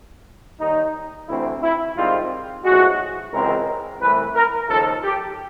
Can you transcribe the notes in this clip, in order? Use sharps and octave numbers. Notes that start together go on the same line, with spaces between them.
D#2 D#3 G3 D#4
D2 C3 E3 A3 C4 E4
E4
G#2 D#3 G3 C4 F4
B1 A2 F3 G#3 F#4
C#2 C3 E3 G#3 C4 A#4
C2 C3 E3 A3 B4
A#4
D#2 C#3 F3 A4
G4